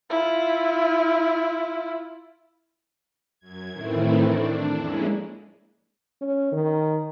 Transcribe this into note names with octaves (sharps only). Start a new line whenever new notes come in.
E4 F4
F#2 G#6
A2 D#3 E3 A3 C4 E4
D4
F2 G#3 A#3 C#4 E4
C#4
D#3